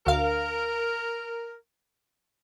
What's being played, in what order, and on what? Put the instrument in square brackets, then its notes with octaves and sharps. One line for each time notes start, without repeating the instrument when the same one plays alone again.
[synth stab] D2 F5 [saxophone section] A#4